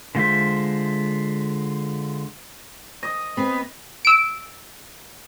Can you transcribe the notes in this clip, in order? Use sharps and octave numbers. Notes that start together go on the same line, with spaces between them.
D3 G#3 F4 C5 E5
D#5
B3 C4
E6 D7